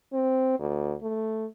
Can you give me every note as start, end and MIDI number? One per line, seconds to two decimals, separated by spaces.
0.13 0.56 60
0.59 0.94 38
1.02 1.46 57